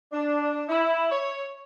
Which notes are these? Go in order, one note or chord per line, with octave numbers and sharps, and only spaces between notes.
D4
E4
C#5